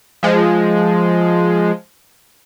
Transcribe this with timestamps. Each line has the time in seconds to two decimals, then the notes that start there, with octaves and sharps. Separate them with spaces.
0.23 F3 G#3